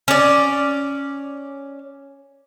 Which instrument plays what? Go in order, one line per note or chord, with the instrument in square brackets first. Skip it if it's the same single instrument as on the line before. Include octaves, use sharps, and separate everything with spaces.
[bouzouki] C#4 D5